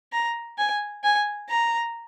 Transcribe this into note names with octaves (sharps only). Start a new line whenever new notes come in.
A#5
G#5
G#5
A#5